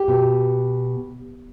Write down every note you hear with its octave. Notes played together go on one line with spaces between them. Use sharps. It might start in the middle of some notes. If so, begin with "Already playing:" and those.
Already playing: G4
B2